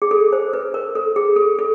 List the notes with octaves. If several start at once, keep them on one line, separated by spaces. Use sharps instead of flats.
G#4
A4
C5
B4
A#4
A4
G#4
A4
A4